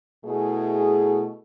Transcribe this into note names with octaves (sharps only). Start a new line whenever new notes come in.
B2 A3 E4 G#4